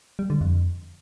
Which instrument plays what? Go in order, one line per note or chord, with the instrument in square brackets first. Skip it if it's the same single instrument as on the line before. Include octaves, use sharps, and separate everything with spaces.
[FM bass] G3
D3
F2